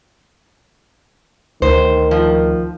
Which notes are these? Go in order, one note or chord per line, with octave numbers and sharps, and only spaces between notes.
D2 D#3 C5
F3